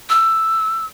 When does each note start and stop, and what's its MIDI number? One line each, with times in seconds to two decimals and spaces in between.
0.10 0.86 88